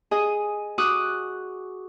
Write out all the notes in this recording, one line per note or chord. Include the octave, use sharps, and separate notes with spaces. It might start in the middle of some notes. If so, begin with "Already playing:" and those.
G#4 D#5
F#4 D6 D#6 F#6